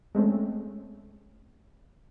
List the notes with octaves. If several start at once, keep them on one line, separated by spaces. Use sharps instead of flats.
G#3 A3 C4 C#4